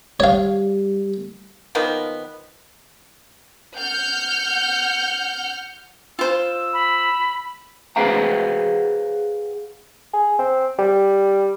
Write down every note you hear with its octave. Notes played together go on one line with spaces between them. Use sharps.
G3 C#5 F5
D#3 F3 A#3 B3
F#5 F6 G6
F4 C5 E6
B5
G#4 B4 C5 F5 F#5 A#5
G#4
C4
G3